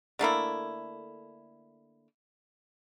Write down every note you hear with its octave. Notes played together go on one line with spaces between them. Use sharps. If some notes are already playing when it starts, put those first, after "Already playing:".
D3 A3 A#3 E4